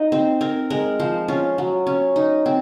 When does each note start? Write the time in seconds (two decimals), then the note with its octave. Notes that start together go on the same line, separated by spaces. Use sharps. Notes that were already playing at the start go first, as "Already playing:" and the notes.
Already playing: D#4 D#5
0.12 C4 C5
0.41 C4 A#4
0.70 G#3 A#4
0.99 F3 C5
1.28 C#4 F4
1.58 F#3
1.87 C#4
2.16 D#4
2.46 C4